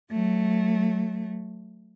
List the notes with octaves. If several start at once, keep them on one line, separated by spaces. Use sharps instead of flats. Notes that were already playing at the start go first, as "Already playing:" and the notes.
F#3 A3